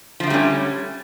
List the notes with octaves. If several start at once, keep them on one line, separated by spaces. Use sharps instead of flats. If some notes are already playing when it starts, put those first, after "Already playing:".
D3 F3 G3 A3 C#4